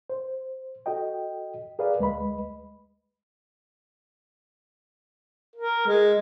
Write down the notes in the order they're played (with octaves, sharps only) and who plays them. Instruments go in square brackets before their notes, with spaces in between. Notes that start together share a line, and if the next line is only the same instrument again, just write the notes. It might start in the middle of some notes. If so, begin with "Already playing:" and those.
[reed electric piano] C5
F#4 A4 D#5 G5
G#4 A#4 B4 D5 F5
D2 G#3 B4 D#5 B5
[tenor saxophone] A#4
G#3